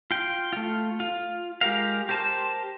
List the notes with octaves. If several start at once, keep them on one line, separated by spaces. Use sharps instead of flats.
F4 G5
A3 F4
F4
G#3 G4 A#4 F5
G4 A#4 C5 A5